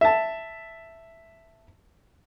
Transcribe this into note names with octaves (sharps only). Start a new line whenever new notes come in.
E5 A5